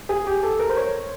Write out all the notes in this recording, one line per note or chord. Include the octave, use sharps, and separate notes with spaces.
G#4
G4
A4
A#4
C5
C#5